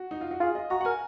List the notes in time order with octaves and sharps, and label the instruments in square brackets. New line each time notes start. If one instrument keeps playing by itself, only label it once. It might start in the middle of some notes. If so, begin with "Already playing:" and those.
Already playing: [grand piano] F#4
D#4
F4
F#4
[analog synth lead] F4 [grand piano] G#4
[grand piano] D#5
[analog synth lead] F#4 [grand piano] A#5
[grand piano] F#5
[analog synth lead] A#4 [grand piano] G#5